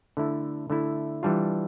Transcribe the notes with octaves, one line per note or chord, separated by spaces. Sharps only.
D3 A3 E4
D3 A3 E4
E3 G3 D4 F4